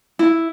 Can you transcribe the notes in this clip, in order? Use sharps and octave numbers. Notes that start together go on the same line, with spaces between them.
E4